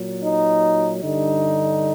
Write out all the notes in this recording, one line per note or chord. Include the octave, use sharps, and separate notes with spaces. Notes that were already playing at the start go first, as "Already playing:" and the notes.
Already playing: A#2 F#3
D#4
G2 D3 G3 D#4